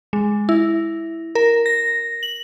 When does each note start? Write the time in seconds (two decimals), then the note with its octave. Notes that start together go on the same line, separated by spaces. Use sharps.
0.13 G#3
0.49 E4
1.35 A#4
1.66 A#6
2.23 F#7